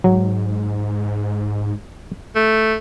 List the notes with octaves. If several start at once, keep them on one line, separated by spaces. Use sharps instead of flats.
G#2 F#3
A3